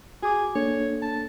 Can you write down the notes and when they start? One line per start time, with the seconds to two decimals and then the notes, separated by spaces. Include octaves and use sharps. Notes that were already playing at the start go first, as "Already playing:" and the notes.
0.23 F#4 G#4 D6
0.56 A#3 D4 A4 C#5
1.02 A5